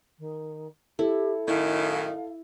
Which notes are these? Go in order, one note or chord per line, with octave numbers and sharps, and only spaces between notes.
D#3
E4 G4 A4
F#2 A2 D#3 E4 F5